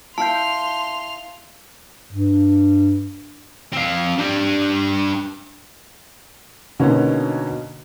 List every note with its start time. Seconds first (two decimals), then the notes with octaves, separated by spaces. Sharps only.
0.18 E4 F5 A5 C6 G6 F7
2.11 G2
3.73 C4 F5
4.19 D4 G4
6.80 B2 D3 A#3 B3 C#4 D#4